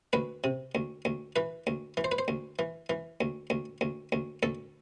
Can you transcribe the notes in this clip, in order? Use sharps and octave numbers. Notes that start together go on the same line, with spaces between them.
D2 B4
C3
D2
D2
E3 B4
D2
E3
C5
B4
C5
D2
E3
E3
D2
D2
D2
D2
D2 A4